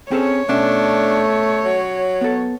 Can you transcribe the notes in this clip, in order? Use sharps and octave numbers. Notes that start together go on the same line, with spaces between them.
C4 C#4 G#4 A4 C#5
B2 A3 C#4 D4 E5
F#3
B3 A4